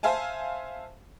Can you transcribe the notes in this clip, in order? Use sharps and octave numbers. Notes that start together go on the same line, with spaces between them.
C5 E5 F5 G#5 A5